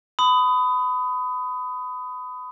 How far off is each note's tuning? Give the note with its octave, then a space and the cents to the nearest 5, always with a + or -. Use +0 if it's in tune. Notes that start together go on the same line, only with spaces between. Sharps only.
B5 +30 D#6 +5